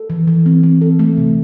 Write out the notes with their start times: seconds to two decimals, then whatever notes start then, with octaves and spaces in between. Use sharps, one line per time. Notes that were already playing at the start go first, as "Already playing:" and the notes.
Already playing: A4
0.10 E3
0.27 E3
0.46 C4
0.63 C4
0.81 A4
0.99 A3
1.17 C3